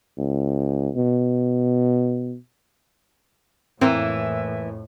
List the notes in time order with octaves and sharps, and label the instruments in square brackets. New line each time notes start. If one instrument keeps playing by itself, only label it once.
[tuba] C#2
B2
[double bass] F2 A2 [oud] E3 A#3 [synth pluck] C4 [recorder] E5